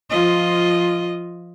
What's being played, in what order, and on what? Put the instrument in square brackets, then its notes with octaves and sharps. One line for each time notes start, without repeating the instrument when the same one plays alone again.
[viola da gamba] F3 F4 D#5